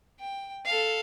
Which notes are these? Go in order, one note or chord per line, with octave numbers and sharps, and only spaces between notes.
G5
A4 F5